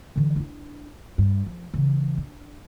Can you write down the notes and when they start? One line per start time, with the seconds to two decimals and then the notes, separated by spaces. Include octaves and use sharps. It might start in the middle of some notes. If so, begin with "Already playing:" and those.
0.16 D3 E3
0.36 D4 E4
1.18 G2
1.46 F3
1.74 C#3 E3
2.17 D4